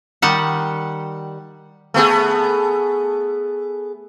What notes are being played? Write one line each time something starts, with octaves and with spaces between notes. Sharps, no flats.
D#3 G3 F#5
A3 B3 G#4